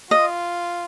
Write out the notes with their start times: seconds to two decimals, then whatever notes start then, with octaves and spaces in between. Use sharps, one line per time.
0.11 F4 D#5